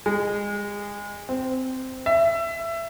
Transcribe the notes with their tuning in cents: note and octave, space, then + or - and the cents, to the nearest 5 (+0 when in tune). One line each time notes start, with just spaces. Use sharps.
G#3 -25
C4 -10
E5 +20